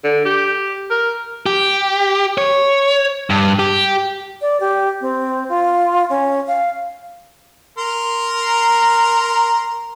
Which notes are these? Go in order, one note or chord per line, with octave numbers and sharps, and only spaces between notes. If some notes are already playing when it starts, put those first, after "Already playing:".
D3
G4
A#4
G4
C#5
G2
G4
D5
G4
C4
F4
C#4
F5
A#4 A#5 C6